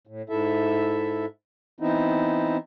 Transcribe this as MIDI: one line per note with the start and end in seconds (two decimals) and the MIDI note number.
0.07 0.22 45
0.29 1.26 44
0.29 1.26 64
0.29 1.26 69
0.29 1.26 76
1.80 2.57 52
1.80 2.57 59
1.80 2.57 60
1.80 2.57 63
1.80 2.57 64